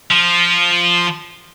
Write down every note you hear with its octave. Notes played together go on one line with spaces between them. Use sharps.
F3